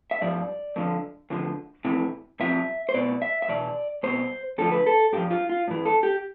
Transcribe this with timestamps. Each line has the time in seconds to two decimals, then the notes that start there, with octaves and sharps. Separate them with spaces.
0.11 E5
0.21 G2 F3 D5
0.76 F2 D3 F3
1.30 D2 D3 F3
1.85 F2 C3 E3
2.40 C2 C3 F3 E5
2.89 C5
2.94 C2 B2 D5
3.22 E5
3.42 E5
3.48 E2 B2 D5
4.03 C2 B2 C5
4.58 D2 D3 F3 A4
4.72 B4
4.87 A4
5.13 G2 F3 G4
5.31 F4
5.49 F4
5.68 G2 E3
5.85 A4
6.03 G4